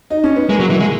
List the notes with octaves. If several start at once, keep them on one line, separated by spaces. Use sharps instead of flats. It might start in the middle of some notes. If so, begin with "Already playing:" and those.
D#4
C#4
B3
G#3 A#3
F#3
E3
G#3